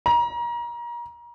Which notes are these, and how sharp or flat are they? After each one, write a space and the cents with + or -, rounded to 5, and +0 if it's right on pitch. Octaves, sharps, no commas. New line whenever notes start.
A#5 +30